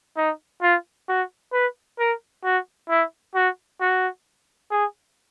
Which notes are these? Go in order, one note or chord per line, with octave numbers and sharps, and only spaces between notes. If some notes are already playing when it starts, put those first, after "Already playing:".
D#4
F4
F#4
B4
A#4
F#4
E4
F#4
F#4
G#4